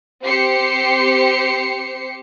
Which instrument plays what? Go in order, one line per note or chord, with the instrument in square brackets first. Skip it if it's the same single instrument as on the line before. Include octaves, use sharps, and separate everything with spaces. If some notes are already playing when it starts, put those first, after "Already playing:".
[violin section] C4 G4 C5 C7 C#7